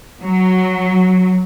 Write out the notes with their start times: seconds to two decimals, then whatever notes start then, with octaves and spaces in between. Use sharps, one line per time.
0.22 F#3